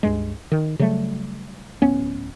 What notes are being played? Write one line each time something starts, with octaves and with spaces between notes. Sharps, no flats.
C#2 G2 G#3
D#3
C#3 F#3 G3 A3
D1 B3 C#4